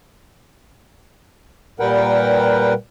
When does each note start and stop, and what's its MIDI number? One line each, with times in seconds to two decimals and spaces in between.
1.80 2.73 46
1.80 2.73 55
1.80 2.73 70
1.80 2.73 71
1.80 2.73 78
1.80 2.73 79